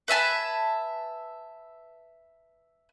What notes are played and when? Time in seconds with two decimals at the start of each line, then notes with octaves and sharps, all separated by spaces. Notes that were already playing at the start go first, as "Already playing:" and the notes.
0.08 B4 E5 G#5 A5